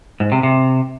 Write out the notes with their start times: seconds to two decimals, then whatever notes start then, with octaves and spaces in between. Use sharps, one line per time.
0.20 G#2
0.32 C3
0.43 C3